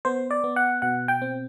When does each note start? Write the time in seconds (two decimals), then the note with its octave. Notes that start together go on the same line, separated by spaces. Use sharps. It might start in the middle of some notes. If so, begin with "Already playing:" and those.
0.05 B3 C5
0.31 D5
0.44 B3
0.56 F#5
0.82 B2 F#5
1.08 G5
1.22 C4